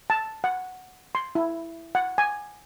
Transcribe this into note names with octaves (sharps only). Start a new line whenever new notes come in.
A5
F#5
C6
E4
F#5
G#5